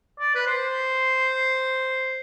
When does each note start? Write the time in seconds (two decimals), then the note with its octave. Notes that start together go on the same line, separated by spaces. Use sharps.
0.20 D5
0.35 B4
0.46 C5